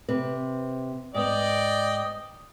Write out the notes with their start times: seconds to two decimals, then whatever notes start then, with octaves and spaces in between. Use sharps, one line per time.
0.08 C3 C4 B4
1.14 G#2 B3 D5 D#5 G5